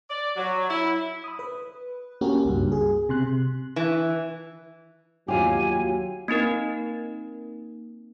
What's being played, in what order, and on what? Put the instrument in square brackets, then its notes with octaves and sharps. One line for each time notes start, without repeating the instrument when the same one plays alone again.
[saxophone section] D5
F#3
E4
[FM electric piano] B5 D#6
B4
A#3 C#4 F#4 G4 A#4
C#2 G2
G#4
C3 C6 F#6
[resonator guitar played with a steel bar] E3
[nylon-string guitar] D#2 F4 G4 [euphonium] F#3 [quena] G#5
[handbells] A#3 C4 D#4 A#4